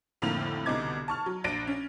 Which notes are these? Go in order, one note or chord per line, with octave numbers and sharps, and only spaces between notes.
F2 A2 D3 A#3 F6 F7
C2 B2 D3 D#4 D6 G#6
A5 C#6 F6
F#3
A#1 D4 A6 A#6 D7 D#7
C#4